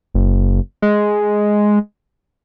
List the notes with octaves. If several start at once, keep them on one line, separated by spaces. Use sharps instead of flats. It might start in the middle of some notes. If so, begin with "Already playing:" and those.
F#1
G#3